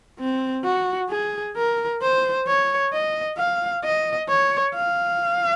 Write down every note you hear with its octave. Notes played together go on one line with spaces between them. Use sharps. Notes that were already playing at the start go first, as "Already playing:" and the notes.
C4
F#4
G#4
A#4
C5
C#5
D#5
F5
D#5
C#5
F5